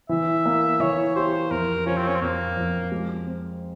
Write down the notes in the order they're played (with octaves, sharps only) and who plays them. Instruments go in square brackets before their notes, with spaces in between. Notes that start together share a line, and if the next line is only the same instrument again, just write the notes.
[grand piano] E3 [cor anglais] E5
[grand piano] A#3
[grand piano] E3 [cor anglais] C#5
[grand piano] G4 [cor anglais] C5
[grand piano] F2 [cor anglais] A#4
[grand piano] F3 [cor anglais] C#4
[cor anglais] C4
C#4
C4
[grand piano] F2 [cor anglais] A#3
[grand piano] F2
G#3
C4